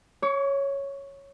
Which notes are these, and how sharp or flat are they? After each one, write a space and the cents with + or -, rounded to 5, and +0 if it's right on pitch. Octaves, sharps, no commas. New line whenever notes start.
C#5 +0 C#6 +45